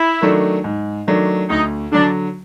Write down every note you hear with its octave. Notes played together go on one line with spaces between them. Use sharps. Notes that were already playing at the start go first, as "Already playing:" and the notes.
Already playing: E4
D#3 F#3 A3 D4
G#2
D#3 F#3 A3 D4
D2 D#4
D3 F#3 D4